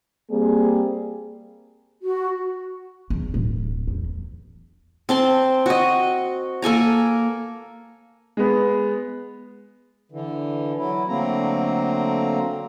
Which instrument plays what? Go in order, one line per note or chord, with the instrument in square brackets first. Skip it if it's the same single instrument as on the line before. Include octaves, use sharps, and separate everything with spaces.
[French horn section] G3 A#3 C4 G#4
[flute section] F#4
[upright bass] E2
D1
E2
[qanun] C4 A5 C6
F#4 D#5
A#3 A4 G#5 A#5
[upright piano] G#3 B3
[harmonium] D3 E3
F#3 E4
D3 F#3 A3 A#3 C4 A#5